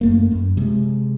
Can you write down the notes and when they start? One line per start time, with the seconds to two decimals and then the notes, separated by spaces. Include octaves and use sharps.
0.01 F#2 A3 A#3
0.31 F#2
0.57 C3 G#3